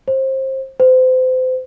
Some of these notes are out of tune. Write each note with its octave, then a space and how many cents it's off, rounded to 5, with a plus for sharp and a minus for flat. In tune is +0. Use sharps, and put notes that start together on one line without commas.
C5 +25
C5 -30